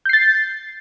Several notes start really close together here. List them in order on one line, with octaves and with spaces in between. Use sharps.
G6 C7 A6